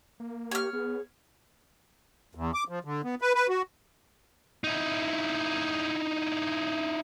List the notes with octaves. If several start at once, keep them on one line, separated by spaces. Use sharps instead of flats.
A#3
G4 C#5 F6
B3 G#4
E2
D6
F3
D3
B3
B4
B4
F#4
D#4 E4